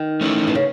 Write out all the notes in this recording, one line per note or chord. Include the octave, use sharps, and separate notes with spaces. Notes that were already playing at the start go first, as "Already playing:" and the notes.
Already playing: D#3
A3 C#4 E4
B2
C#3